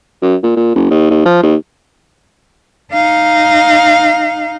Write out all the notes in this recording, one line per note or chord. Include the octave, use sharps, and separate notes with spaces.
F#2
A#2
A#2
F#1
D#2
D#2
F3
D#2
D#4 F5